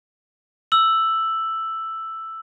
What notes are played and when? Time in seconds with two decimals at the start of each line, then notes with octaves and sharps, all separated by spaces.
0.72 E6 F#7